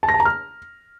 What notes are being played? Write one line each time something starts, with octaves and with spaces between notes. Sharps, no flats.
A5
A#6
A5
A#5
F6